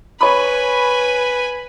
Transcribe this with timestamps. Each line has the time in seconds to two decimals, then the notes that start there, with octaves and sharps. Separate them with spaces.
0.21 B4 C#5 G#5 B5